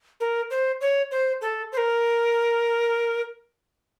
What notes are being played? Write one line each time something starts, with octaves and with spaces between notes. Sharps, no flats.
A#4
C5
C#5
C5
A4
C5
A#4